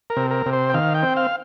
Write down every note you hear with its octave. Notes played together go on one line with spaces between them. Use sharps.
A#4
C3
A#4
C3
C5
G5
D#3 F5
G5
C4
F5